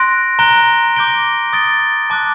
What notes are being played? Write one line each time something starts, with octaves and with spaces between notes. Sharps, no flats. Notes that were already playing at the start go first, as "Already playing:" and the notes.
Already playing: C6 F#6 A#6 D7
A#5 F#6 A#6 D7 G7
D6 G6 A#6 D7 G7
D#6 A6 D7 G7
A5 D6 F#6